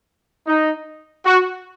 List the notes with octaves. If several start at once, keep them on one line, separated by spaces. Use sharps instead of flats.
D#4
F#4